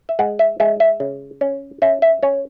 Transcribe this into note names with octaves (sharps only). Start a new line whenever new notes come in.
E5
G#3 F#5
E5
G#3 E5
E5
C#3
C#4
C#4 E5
E5
C#4 C#5